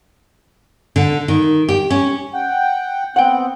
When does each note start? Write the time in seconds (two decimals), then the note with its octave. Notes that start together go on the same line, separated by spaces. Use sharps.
0.96 D3
1.28 D#3
1.69 G4
1.90 C#4
2.34 F#5 G5
3.16 B3 C4 F#5 G5